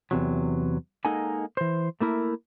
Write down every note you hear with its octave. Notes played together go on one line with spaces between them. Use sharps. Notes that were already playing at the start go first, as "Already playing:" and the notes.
E2 C3 F#3
G#3 A#3 D#4 A4 F#5 G#5
E3 C5
A3 A#3 E4 A#4